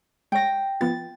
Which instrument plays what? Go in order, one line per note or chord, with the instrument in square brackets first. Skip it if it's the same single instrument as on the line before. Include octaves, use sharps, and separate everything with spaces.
[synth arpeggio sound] G#3 C#5 [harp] G5 A#6
[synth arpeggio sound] F3 B3 F4 [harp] A6